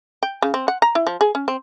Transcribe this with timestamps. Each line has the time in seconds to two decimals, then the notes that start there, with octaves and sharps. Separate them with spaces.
0.23 G5
0.42 C#3
0.54 C4
0.68 F#5
0.82 A#5
0.95 E4
1.07 F3
1.21 G#4
1.35 C#4
1.48 C4